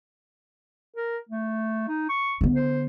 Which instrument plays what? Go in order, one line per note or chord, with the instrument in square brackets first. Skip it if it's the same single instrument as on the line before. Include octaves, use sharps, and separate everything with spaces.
[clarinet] A#4
A3
D#4
C#6
[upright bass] D3 B3
[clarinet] C5